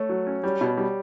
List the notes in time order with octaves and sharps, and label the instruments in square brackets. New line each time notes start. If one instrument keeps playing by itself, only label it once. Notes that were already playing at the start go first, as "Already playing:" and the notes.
Already playing: [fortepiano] A3 [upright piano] C#5
[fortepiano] F#3
C#4
[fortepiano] G3 [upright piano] C#5
[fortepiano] B2
G3